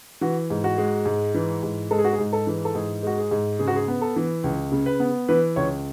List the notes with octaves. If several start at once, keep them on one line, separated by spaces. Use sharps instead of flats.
E3 F#4
G#2
F#4
G#3
G#2
E3
G#2
G#3 A4
G#4
F#4
G#4
G#2
A4
E3
A4
G#2 G#4
G#3 F#4
G#4
G#2
C#3 G#4
F#4
G#4
B3
A4
E3
C#2
C#3
B4
B3
E3 B4
C#2 C#5